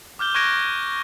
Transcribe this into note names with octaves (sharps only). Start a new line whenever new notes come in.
D6 F6 G6 G7
C#6 F#6 G#6 A#6 D7 E7